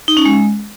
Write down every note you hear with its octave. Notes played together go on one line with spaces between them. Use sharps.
D#4
C#4
G#3